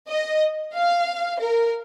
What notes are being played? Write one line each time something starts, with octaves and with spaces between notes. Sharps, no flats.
D#5
F5
A#4